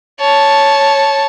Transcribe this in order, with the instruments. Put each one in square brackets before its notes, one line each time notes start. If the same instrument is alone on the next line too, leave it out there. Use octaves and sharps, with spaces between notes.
[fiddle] C#5 A5